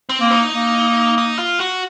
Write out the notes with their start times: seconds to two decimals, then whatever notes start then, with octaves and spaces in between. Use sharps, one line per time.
0.09 C4
0.20 A#3
0.31 D#4
0.53 A#3
1.18 D#4
1.39 F4
1.60 F#4